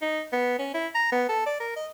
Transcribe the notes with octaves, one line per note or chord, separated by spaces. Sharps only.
D#4
B3
C#4
E4
A#5
B3
A4
D5
A#4
D#5